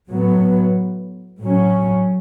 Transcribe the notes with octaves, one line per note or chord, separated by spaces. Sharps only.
A2 F#3 B3
A2 F#3 C#4